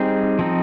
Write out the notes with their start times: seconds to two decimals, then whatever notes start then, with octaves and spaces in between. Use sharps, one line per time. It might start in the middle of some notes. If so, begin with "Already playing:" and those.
Already playing: G3 C4 D#4 G#4
0.39 F3 C4 D#4